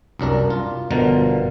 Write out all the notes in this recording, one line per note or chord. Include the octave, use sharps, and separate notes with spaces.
C2 F#2 D4 A#4
F4
G1 B2 D3 F3 A#4